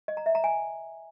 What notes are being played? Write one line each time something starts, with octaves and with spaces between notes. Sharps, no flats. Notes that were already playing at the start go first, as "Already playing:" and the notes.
D#5
A#5
E5
A#5
G#5